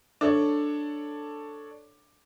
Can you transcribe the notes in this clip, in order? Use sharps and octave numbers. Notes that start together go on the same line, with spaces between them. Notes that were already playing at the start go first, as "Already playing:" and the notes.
D4 A4 C#5 D5